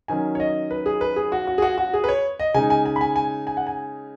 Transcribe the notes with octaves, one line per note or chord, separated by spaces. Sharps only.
D#3 F#3 C#4 G#5
C#5
D#5
B4
G#4
B4
G#4
F#4
F#4
G#4
F#4
F#4
G#4
B4
C#5
D#5
C#3 G#3 D#4 G#5
G#5
G#5
B5
G#5
G#5
G#5
F#5
G#5